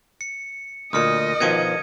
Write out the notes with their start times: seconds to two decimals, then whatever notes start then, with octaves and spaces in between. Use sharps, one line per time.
0.21 C#7
0.93 D2 A#2 D#5 D#6 F6 C#7
1.40 B2 D#3 F3 G#6 C#7 D#7